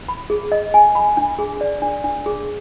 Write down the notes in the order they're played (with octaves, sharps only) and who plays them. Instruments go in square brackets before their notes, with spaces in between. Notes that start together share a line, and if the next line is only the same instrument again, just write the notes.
[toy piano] B5
G#4
D#5
G#5
B5
D4
G#4
D5
D4
D4
G#4